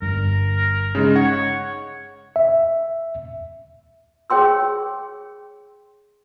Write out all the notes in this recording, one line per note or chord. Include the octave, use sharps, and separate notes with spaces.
G1 G2 A#4
C#3 G#3 D#4
C#5 F#5
E5
G#4 C#5 G5 C6 E6